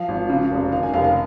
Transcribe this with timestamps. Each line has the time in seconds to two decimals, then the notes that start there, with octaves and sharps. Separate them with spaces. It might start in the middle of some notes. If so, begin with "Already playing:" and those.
Already playing: F3 F5
0.08 G#1
0.29 C#3
0.51 F1
0.72 D#3 F5
0.83 G#5
0.93 F1 F5
1.04 F5